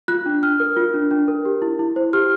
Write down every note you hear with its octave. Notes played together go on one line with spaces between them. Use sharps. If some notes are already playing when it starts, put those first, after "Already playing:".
F4 F#6
D4
D4 F6
A#4
F4
D4
D4
A#4
G4
E4
E4
C5
G4 F6